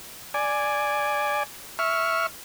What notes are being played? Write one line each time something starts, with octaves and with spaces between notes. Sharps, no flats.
D5 G#5
E5 C#6 F6